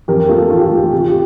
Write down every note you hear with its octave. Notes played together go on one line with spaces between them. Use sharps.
F2 G4 A#4
A3 F4 A4
D#3 F4
G4
F4
A3 G4
F4
C3 G4
F4
G4